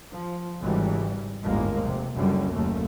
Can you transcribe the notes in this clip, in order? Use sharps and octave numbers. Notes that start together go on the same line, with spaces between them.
F3
G#1 G#2 C#3 E3 G3
G1 D#2 A2 G#3 A#3
F1 C3
F#1 C#2 F#2 D3 G3
F#1 D#2 A3 A#3